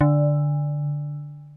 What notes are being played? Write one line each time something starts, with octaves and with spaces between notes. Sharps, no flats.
D3